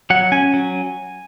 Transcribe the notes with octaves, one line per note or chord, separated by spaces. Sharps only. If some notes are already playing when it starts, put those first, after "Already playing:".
F#3 F#5
C#4 G#5
F#3